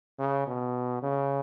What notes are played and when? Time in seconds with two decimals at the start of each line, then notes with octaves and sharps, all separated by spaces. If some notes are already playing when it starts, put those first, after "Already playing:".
0.19 C#3
0.47 B2
1.03 C#3